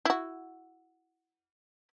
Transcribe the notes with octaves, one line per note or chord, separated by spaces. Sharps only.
E4 F#4